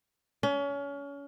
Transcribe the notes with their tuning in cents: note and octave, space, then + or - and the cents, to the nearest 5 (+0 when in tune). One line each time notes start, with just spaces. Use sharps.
C#4 +30